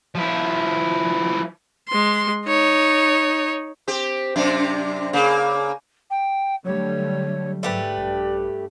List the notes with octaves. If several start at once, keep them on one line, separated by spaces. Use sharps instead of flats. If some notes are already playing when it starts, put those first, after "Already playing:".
F3 E4
G#3 C6
D#4 C#5
C4 G4
F#2 C3 D4
C#3 A#3
G5
D3 F#3 G3 A3 C#5
G#2 A3 G4 B4 D5
A#1 G2